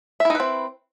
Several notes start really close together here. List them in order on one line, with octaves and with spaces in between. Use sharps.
E5 E4 D#4 B4 C4